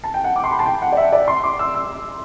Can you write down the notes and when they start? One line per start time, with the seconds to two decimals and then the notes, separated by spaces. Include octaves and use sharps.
0.04 A5
0.14 G5
0.24 F#5
0.36 D6
0.44 C6
0.51 B5
0.59 A5
0.66 G5
0.82 F#5
0.92 D5
0.97 E5
1.12 D5
1.28 C6
1.44 D6
1.59 E6
1.74 E6